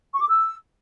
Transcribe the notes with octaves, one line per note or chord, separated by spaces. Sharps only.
C#6
D6
E6